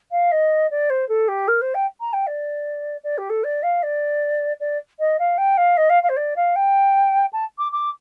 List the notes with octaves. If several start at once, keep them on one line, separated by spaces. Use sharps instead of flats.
F5
D#5
D5
C5
A4
G4
A#4
C5
G5
A#5
G5
D5
D5
G4
A4
D5
F5
D5
D5
D#5
F5
G5
F5
D#5
F5
F5
C5
D5
F5
G5
A5
D6
D6